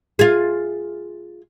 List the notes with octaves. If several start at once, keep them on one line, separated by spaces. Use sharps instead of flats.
F4 G#4